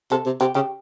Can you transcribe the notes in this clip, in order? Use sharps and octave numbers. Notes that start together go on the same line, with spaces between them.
C3 A4
C3
C3 G4
C#3 G4